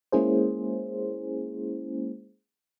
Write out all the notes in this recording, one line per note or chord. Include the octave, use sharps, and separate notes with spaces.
G#3 A#3 C#4 E4 G#4 C5